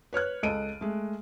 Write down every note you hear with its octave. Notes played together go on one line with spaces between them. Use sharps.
B4 C#5 F6 F#6
C#2 A4 D#5 D7 D#7
G#3 A3